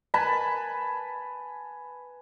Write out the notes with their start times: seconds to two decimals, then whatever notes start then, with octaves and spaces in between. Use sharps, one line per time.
0.14 B4 G#5 A5 B5